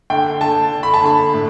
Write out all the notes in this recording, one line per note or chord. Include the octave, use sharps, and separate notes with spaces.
D3 G5
D3 A5
D3
B5
A5
D3 B5
A2